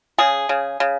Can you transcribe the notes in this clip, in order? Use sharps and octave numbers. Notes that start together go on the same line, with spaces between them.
C#3 G#4
C#3
C#3